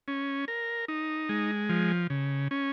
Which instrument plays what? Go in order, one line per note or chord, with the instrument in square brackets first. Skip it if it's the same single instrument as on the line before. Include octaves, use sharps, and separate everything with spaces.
[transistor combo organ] C#4
A#4
D#4
G#3
F3
C#3
C#4